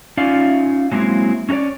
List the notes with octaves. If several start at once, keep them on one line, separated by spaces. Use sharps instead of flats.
C#4 D#4 F4 D5 E5 F5
F#3 G#3 A#3 C4 E4
C#4 D#4 F#4 C#5 D5